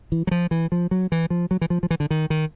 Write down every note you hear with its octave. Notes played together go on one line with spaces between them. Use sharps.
E3
F#3
F3
E3
F3
F#3
E3
F3
F#3
E3
F3
F3
E3
D3
D#3
D#3